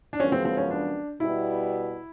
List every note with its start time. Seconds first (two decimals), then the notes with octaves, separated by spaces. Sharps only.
0.13 D4
0.19 F#2 C#3 F3 G#3 B3 C#4
0.32 C4
0.45 C4
0.57 C#4
0.70 D4
1.20 B2 G3 B3 E4